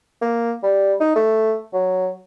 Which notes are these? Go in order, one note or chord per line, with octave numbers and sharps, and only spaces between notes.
A#3
G3
D#4
A3
F#3